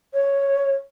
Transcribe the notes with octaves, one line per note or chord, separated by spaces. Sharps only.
C#5